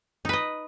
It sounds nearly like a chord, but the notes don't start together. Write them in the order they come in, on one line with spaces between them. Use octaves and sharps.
D#4 B4 D#5